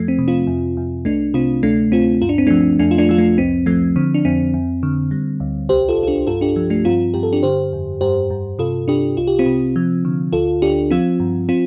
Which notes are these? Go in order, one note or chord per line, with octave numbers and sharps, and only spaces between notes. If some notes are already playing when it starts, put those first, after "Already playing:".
Already playing: F2 F3 A3
C4
C3
C4 F4
F2
F2
C2 A3 D4
C3 C4 F4
D2 A3 D4
D2 C4 F4
G2 F4
D4
C4
F3 A3 D4
F2 A3 D4
F4
A3 D4
F3 F4
A3 D4
C2 C4
F3 A3
D3 C4
D4
F2 C4
F2
D3
G3
D2
C2 G4 C5
F4 A4
C2
F4
D4 G4
G2 F4 A4
D4 G4
F3
A3 D4
G2 C4 F4
G2 G4
A4
D4 G4
D3 G4 C5
F2
G2 G4 C5
G2
C3 F4 A4
C3 D4 G4
C2 F4
G4
C4 F4
C3
F3
D3
D2 F4 A4
D2 D4 G4
F3 C4 F4
G2
C4 F4